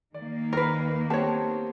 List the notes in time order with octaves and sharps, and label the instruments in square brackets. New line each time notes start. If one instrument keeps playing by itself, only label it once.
[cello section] D#3 A#3 [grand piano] D5
[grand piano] D#2 [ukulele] A#4 B4
[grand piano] B3 C4 G4 [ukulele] C#5 A5